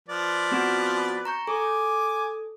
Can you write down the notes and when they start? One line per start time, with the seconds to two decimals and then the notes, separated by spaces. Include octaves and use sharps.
0.09 F3 B4 D5
0.51 B3 C4 F#4
1.25 A#5 C#6 G6
1.47 A4 G#5 D6